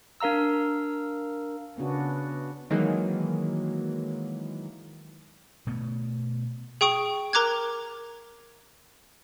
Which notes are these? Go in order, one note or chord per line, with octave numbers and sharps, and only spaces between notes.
D4 A#4 F5 A#5 E6
C#3 B3 D4 F#4
D#3 E3 F#3 G#3 A#3
B2 A3 B3
G#4 G5 C#6 D#6 D7
A#4 A#5 D6 F#6 G#6